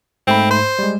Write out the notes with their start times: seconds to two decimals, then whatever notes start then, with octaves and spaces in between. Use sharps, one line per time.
0.27 G#2 A3 C4 B5
0.51 C5
0.79 G3 G#3